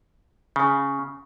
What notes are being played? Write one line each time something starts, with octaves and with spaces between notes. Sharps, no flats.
C#3